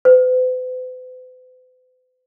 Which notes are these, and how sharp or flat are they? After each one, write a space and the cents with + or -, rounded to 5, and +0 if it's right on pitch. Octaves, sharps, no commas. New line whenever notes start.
B4 +45